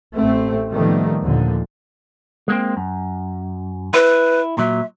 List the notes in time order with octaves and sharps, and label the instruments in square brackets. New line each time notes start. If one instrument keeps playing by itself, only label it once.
[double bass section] A1 A3 C4
A2 D#3 F3 G3 A3 B3
D#2 A#2 D3 F3
[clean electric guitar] G#3 A#3 C4
F#2
[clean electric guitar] E4 [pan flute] B4
[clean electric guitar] A#2 F#3 [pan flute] E5